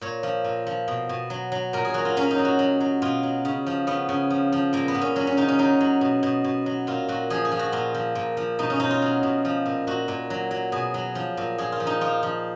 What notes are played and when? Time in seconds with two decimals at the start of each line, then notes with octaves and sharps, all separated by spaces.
0.01 A#2 C#5
0.23 F3
0.44 A#2
0.67 F3
0.88 B2
1.09 B2
1.30 F#3
1.52 F#3
1.73 A#2 A#4
1.85 G#4
1.94 F#3 F#4
2.05 F4
2.17 F#3 C#4
2.31 D#4
2.38 F#3
2.45 F#4
2.59 F#3
2.80 F#3
3.02 B2 F4
3.23 F#3
3.45 C#3
3.66 F3
3.87 C#3 B3
4.09 C#3
4.30 F3
4.52 F3
4.73 A#2 A#3
4.88 B3
4.95 A#2
5.01 C#4
5.16 F#3 C#4
5.27 C#4
5.37 C#3 D#4
5.48 C#4
5.59 F#3 D#4
5.80 F#3
6.01 B2
6.23 B2
6.44 B2
6.66 F#3
6.87 A#2 F4
7.08 A#2 F#4
7.30 F3 G#4
7.45 G#4
7.52 F3
7.59 F#4
7.72 A#2 F4
7.94 F3
8.15 A#2
8.37 F3
8.59 B2 D#4
8.70 C#4
8.80 B2 D#4
8.91 F4
9.02 F#3
9.23 B2
9.45 F3
9.66 A#2
9.87 A#2 F#4
10.08 A#2
10.30 F#3
10.51 F#3
10.72 B2 G#4
10.94 F#3
11.15 F3
11.37 A#2
11.58 A#2 G#4
11.72 F4
11.80 F3
11.87 D#4
12.01 F3 F4
12.23 F3